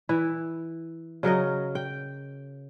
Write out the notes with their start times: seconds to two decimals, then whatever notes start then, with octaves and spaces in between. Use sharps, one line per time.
0.09 E3 E4
1.23 C#3 F#3 A#4 D#5
1.75 G5